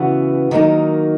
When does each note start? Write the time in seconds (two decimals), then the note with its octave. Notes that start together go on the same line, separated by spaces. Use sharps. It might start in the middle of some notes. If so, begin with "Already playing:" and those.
Already playing: C#3 E3 B3 F#4
0.51 D#3 F#3 A#3 D#4